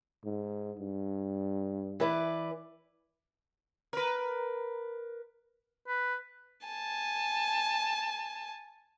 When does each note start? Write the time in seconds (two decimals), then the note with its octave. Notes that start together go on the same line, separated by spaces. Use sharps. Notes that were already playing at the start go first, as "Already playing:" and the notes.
0.25 G#2
0.80 G2
2.00 E3 B4 D5
3.93 A#4 B4
5.88 B4
6.67 G#5 A5